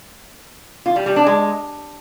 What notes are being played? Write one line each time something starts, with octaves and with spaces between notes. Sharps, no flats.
F4
G3
G3
D4
G#3